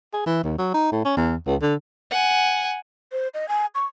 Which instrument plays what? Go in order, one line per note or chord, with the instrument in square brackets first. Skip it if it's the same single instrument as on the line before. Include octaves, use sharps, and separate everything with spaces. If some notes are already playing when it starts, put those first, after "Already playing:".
[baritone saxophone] G#4
E3
D#2
F#3
D#4
A2
C#4
E2
C#2
D3
[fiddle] F#5 G#5
[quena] C5
D#5
G#5
C#6